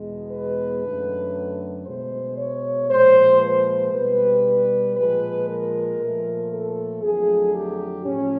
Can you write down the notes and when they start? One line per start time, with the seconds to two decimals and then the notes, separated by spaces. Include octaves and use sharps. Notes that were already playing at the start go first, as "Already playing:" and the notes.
Already playing: E2 B2 G#3
0.31 B4
0.84 F#2 D3 F#3 A3
1.86 B2 G#3 C5
2.37 C#5
2.89 A#2 F3 G#3 C5
3.41 B4
3.93 B2 G3 B4
4.95 A#2 F3 G#3 B4
5.47 A#4
5.99 A#2 F3 A3
6.50 A4
7.02 F2 D3 F#3 A3 G#4
7.53 G4
8.06 A2 F3 A3 C#4